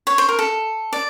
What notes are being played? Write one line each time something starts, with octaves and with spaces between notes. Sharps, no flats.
C#5
C5
A#4
A4
D5